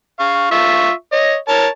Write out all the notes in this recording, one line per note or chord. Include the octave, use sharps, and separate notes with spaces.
F5 C#6
F4 E5 C#6
C#5 D#5
A#4 C#5 A5